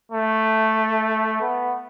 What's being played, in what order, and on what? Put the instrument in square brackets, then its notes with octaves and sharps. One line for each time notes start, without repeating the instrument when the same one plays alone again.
[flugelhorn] A3
B3